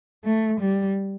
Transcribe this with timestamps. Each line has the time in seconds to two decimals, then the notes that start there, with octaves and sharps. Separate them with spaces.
0.24 A3
0.60 G3